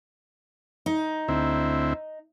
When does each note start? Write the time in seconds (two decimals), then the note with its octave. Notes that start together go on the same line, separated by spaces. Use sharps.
0.86 D#4
1.28 D2 C4 E4